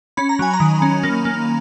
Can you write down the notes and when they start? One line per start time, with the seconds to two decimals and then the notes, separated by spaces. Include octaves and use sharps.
0.17 C#4 B5
0.29 A#5
0.39 F#3 G#5
0.53 A#5
0.60 D#3
0.82 C#4
1.03 A#3
1.25 A#3